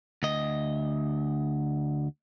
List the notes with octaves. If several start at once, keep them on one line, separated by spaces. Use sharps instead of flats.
D2 D#5